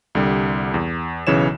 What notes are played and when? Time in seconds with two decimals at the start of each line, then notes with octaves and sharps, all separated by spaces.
0.15 C2 D3 G3
0.74 E2
1.27 B1 C#3 E3 C#5 E7